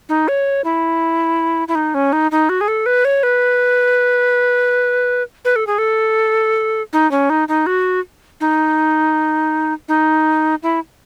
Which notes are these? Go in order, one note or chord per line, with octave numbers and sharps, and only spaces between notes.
D#4
C#5
E4
E4
D#4
C#4
D#4
D#4
F#4
G#4
A4
B4
C#5
B4
B4
A4
G#4
A4
D#4
C#4
D#4
D#4
F#4
D#4
D#4
E4